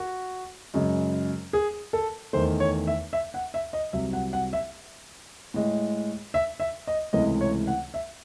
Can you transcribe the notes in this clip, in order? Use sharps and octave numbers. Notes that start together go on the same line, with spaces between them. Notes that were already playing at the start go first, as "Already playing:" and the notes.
Already playing: F#4
F#2 C#3 G#3
G#4
A4
E2 D#3 A3 C5
C#5
E5
E5
F#5
E5
D#5
C2 C3 F#3 E5
F#5
F#5
E5
A2 G#3
E5
E5
D#5
C#2 C3 E3 A3 D#5
C#5
F#5
E5